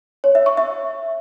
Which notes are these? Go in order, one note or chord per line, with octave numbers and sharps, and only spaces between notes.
C#5
E5
C#6
E5